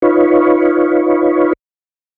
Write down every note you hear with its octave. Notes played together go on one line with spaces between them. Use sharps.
D#4 F4 B4 C#5